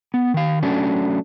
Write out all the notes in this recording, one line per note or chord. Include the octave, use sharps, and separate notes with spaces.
B3
D#3 F5
F#3 A3 C#4 D4